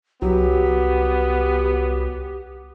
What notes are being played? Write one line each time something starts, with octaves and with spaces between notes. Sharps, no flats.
C2 F#3 B3 G4